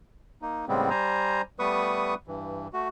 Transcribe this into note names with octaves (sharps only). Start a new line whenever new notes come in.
A#3 D#4
A2 C#3 G3 G#3 B3 C4
G3 C5 G#5 A#5
G3 A3 B3 B4 C#6 D#6
G2 E3
A3 F#4